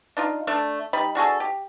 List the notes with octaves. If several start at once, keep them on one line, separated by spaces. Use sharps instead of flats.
D4 D#4 F4
A3 D4 A4
G3 D#4 B5
D4 F#4 G#4 A4
G4